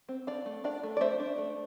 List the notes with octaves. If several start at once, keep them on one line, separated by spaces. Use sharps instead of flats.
C4
D4 D5 F5
A3
D4 D5 F5
A3
D5
A3 C5 E5
D4
A3